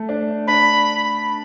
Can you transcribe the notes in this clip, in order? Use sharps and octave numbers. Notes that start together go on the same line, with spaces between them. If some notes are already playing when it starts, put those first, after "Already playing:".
Already playing: A3
D4
D4 B5